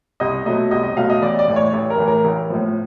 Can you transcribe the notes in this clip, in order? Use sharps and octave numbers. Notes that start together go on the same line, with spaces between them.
C2 D#5
B2 F#3 A3 D#5
C2 D#5
D#5
B2 F#3 A3 F5
D#5
A1 D5
D5
A2 E3
C#5
A1
A#4
A2 E3
A#4
A1
A2 F3